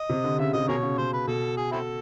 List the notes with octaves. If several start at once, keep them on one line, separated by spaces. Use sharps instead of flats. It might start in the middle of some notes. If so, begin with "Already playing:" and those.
Already playing: D#5
C3
D3
C#3 E5
C3 D#5
B2 G#4 A#4 C#5
C#3
B2 C5
B4
B2 A4
G#4
C4 E4 A4